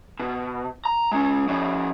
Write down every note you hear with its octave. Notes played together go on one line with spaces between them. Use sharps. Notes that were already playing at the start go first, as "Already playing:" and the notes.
B2
A#5
G#3 C#4
F3 C#4